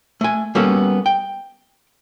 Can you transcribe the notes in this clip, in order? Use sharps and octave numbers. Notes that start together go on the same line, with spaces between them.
A3 G#5
G3 A#3 B3 C#4 F#4 A4
G5